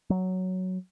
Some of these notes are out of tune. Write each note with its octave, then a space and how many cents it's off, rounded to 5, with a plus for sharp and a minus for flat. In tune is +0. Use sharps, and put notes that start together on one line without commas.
F#3 +5